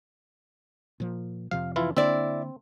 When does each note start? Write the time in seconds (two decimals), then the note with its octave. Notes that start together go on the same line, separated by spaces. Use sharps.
1.00 A#2 F3
1.51 F2 C3 F3 F5
1.76 E3 E4 F4
1.97 D3 A#3 C4 D4 E4 D5